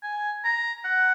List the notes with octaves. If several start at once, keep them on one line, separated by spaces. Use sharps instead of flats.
G#5
A#5
F#5